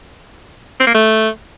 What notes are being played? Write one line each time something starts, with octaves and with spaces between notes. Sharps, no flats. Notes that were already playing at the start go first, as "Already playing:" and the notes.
C4
A#3
A3